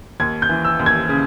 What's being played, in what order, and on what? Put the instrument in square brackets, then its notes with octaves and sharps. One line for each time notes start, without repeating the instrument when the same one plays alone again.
[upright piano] D#2 G#6
G6
E3
E6
D#2
G#6
C#3